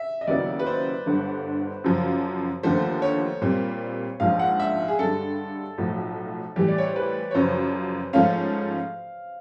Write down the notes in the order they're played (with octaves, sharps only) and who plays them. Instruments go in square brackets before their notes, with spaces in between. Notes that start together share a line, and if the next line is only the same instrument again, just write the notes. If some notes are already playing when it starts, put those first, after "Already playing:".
Already playing: [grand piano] E5
D#5
[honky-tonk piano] D#2 C#3 F#3 B3 E4 [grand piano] D5
[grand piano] B4
C5
[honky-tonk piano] G1 G2 D3
F#2 C#3 F3
[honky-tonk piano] D#2 D3 F3 A3 [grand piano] C5
[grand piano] C#5
[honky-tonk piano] A#2 G3 C4
[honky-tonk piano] A#1 G#2 F3 [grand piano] F5
[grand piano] F#5
E5
G#4
[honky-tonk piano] G2 D3 G3 [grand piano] A4
[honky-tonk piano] B1 A2 F3
[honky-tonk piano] A2 E3 G3 [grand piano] G4
[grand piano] D5
C#5
C5
B4
C#5
[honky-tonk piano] F#2 C#3 F3 [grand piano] C5
[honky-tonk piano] G#2 F3 A3 C#4 [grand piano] F5